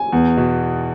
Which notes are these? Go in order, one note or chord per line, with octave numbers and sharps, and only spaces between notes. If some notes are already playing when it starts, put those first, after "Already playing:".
Already playing: G#5
E2
B2